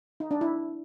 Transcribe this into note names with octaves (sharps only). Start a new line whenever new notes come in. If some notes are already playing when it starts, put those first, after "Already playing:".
D#4
D4
E4